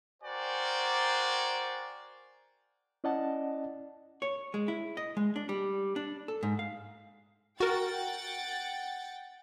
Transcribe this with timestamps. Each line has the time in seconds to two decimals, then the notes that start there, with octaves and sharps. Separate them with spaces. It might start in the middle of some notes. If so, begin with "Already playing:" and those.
0.22 F#4 A#4 C5 D5 G5 G#5
3.04 C#4 E4 D5 D#5 F#5 A5
4.22 C#5
4.54 G#3
4.68 E4
4.97 D#5
5.17 G#3
5.36 D4
5.49 G3
5.96 D4
6.28 A4
6.43 G#2
6.59 F5
7.60 F#4 A#4 F#5 G5 A6